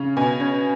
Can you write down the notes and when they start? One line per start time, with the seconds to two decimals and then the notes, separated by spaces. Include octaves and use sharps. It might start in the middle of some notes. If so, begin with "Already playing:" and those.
Already playing: C#3 C#4
0.17 B2 G#5
0.40 C#4